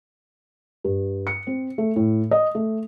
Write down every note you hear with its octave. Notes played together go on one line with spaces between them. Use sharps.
G2
C#7
C4
A3
A2
D#5
A3